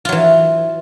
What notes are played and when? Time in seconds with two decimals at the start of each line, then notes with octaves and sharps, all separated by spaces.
0.05 F4
0.09 F#3
0.12 E3